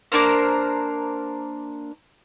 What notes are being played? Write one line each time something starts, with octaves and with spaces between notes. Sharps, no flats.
A#3 D4 A#4 C5